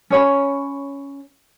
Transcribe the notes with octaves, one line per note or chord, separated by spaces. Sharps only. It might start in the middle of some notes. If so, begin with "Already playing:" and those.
C#4 C#5 B5